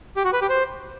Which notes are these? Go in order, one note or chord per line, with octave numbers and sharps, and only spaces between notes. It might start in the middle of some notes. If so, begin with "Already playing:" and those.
G4
F#4
B4
G4
C5